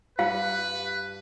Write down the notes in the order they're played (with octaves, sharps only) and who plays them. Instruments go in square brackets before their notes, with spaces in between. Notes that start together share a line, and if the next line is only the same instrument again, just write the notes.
[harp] G2 F#5 [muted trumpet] B4 [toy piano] F5